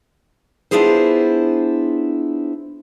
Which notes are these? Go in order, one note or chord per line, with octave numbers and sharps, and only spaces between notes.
B3 D4 E4 F4 G#4 C5